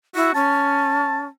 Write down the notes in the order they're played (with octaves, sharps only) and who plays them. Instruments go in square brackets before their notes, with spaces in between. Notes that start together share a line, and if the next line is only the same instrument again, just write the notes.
[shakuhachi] E4 [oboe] F#4
[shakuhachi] C#4 [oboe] A5